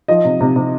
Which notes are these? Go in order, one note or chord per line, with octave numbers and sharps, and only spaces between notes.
F3 D#5
C3
C3
C3